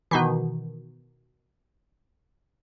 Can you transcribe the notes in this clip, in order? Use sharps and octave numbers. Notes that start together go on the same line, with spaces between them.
B2 D#3 E3